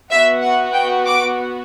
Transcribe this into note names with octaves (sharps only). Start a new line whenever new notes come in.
B3 F#4 E5
F#5
G5
D6